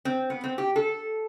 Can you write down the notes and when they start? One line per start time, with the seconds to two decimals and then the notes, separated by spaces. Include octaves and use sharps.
0.05 C4
0.30 B3
0.44 C4
0.58 G4
0.76 A4